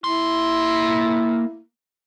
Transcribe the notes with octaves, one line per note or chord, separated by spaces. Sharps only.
A#3 E4 C6